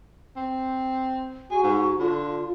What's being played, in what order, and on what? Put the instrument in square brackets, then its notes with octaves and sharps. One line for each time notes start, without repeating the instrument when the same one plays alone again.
[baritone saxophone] C4
[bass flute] F#4 [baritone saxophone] G#4
[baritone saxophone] G#2
[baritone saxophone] D3 [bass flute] F4